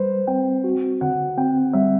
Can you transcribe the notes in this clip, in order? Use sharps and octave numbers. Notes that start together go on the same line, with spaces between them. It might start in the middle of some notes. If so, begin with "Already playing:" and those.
Already playing: G3 B4 C5
C4 G5
F#4
D3 F#5
C4 G5
G3 E5